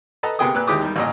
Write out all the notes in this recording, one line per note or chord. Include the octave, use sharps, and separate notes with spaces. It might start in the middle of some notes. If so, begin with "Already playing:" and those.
A4 B4 D#5 A5 A#5
C3 A#3 B3 G#4 G5 D#6
A#2 B4 F#6
D#2 G#3 E4 G4 D6 D#6
D#3 G3
A1 A#2 D#5